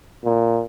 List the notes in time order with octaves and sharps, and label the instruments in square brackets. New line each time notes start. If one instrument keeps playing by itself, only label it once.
[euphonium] A#2